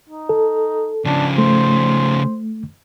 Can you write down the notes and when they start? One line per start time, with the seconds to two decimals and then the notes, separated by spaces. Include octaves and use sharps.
0.09 D#4
0.29 A4
1.06 C#3 F3 D4
1.38 A3 C5